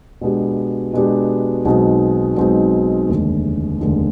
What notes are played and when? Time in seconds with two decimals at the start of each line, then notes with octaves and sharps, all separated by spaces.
0.21 B2 G#3 B3 D4 G4
0.93 B2 G#3 B3 D4 G4
1.65 B1 B2 G#3 C4 D#4
2.37 B1 B2 G#3 C4 D#4
3.08 F1 D#2 D3 G#3
3.80 F1 D#2 D3 G#3